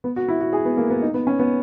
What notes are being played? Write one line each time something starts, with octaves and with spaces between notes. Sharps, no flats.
B3
F#4
E4
F#4
G#4
B3
A#3
B3
D#4
B3
C#4
B3